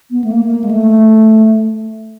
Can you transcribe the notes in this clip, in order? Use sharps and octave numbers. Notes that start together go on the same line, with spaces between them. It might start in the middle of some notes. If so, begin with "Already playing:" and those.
B3
A3
A#3
G#3
A3